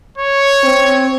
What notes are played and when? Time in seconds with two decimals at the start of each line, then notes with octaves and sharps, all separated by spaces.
0.18 C#5
0.63 C4